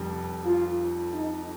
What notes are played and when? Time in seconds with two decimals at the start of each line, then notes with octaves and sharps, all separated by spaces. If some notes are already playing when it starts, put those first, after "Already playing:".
Already playing: F1 F2 G3
0.44 F4
1.12 D#4